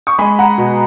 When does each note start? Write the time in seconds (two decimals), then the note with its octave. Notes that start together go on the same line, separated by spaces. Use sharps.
0.07 C#6
0.19 G#3 G#5 B5
0.39 F#5 A#5
0.58 B2